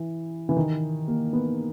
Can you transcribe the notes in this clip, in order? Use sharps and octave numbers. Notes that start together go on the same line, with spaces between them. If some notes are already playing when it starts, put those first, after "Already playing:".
Already playing: E3
E3
D#3
A#3
B3